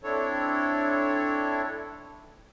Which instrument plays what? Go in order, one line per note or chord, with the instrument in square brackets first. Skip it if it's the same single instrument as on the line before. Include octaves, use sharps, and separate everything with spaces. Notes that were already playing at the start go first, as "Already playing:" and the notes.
[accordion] C4 D4 E4 A4 C#5